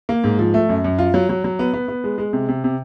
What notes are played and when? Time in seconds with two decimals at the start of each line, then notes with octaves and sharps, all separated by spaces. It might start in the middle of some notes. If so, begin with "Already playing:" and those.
0.09 A#3
0.24 G#2
0.39 F3
0.54 A3
0.69 F#2
0.84 F#2
0.99 F4
1.14 F#3
1.29 F#3
1.44 F#3
1.59 B3
1.74 B3
1.88 B3
2.04 G#3
2.18 G#3
2.33 C3
2.48 C3
2.64 C3